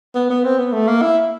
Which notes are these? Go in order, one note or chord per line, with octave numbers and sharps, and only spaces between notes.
B3
B3
C4
B3
A3
A#3
E4